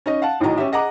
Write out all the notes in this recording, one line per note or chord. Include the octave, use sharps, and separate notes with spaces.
C#4 D#4 D#5
F5 F#5 A5
A1 A2 D#3 F#3 D#5 A#5
C#4 G4 E5
G#4 D#5 F#5 A#5 D6